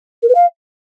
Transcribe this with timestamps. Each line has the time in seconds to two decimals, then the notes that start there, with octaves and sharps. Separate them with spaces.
0.22 A#4
0.29 B4
0.35 F5